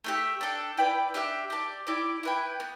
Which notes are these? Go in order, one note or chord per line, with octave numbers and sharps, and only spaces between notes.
A3 D4 G4 E5
D4 A4 G5
E4 B4 D5 G5
D4 G4 E5 G5
G4 D5 A5
E4 G4 D5
E4 B4 G5
B3